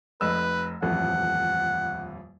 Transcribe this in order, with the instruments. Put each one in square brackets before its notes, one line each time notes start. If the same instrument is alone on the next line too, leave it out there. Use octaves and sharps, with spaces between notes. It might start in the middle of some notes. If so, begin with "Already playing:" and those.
[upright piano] F1 D#5 E6 [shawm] B4
[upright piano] D#1 A1 F2 [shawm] F#5